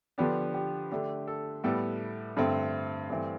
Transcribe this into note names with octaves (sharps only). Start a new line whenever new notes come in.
D3 F3 B3 D4 G4
G4
D3 A3 D4 G4
A4
A2 G3 B3 A4
G2 D3 A3 C4
G2 E3 A3 C4